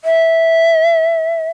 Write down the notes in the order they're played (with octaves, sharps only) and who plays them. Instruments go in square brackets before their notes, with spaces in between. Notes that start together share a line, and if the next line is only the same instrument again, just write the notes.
[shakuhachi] E5